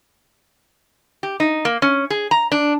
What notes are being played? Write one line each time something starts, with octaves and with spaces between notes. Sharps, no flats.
G4
D#4
A#3
C#4
G#4
A#5
D4